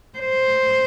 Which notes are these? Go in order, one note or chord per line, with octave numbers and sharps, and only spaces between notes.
C5